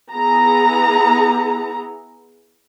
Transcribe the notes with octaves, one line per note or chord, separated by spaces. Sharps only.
B3 E4 G#4 A#5